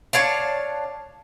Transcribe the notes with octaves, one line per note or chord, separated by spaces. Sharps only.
D4 C#5 F5 A5